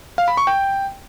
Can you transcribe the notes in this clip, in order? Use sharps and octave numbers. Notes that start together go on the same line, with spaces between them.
F5
B5
C#6
G5